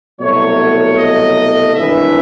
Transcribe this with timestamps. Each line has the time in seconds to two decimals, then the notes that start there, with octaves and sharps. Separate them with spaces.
0.21 C2 B2 F#3 A3 C#5
0.98 D#5
1.75 G#1 G2 E3 A3 E5